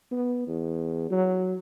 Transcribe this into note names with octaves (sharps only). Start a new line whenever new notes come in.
B3
E2
F#3